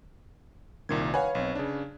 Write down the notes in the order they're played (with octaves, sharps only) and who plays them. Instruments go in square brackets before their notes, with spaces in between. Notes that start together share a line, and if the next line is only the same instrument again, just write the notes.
[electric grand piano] C2 A#2 G#6 [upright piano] D#3
[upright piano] B4 C#5 F5 [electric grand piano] F#5 G#5
[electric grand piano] B1 C4
C#3 D4